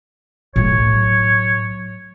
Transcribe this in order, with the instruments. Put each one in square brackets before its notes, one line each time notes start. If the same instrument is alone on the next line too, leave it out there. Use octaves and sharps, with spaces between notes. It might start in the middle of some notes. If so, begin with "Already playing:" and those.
[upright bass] A2 F#3 [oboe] C#5